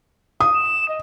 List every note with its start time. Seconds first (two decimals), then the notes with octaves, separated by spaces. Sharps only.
0.40 F5 D#6
0.54 E7
0.89 D#5